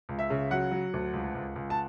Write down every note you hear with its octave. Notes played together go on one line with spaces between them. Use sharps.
C#2
E5
C#3
F#3 F#5
F#3
D2
C#2
C#2
C#2
A5